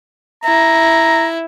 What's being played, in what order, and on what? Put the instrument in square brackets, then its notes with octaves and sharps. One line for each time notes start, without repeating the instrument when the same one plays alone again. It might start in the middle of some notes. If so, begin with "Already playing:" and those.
[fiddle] E4 [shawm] A#5